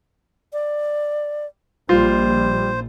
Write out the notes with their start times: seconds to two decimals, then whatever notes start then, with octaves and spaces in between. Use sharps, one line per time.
0.53 D5
1.89 A#1 G3 F4 C5